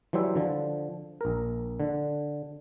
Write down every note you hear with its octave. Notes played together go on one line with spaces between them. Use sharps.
E3 F#3 G3 C5 E5
D3 F3
A#1 A#4
D3